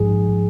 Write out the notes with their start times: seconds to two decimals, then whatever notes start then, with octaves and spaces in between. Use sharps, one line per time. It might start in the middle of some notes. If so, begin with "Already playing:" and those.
Already playing: A#1 G#2 F3 G#4